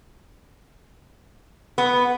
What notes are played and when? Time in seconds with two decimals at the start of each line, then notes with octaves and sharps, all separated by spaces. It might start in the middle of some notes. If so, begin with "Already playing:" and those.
1.78 B3